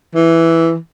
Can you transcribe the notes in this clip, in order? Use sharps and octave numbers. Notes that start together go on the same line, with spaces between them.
E3